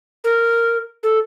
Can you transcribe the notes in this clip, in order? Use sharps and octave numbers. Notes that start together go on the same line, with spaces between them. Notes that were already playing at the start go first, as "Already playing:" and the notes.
A#4
A4